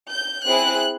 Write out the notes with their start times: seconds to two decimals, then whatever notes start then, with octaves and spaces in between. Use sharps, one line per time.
0.10 G6
0.46 C4 E4 G#4 F#6